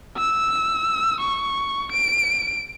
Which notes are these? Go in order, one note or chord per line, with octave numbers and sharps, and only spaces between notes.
E6
C#6
D7